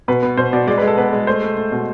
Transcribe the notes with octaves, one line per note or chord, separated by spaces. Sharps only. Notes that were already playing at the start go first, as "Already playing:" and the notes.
B2 B4
B3
B2 C5
B2 D5
G#3 D5
B4
G#3
A4
B3 B4
G#3
A3 C5
A3
A3
B2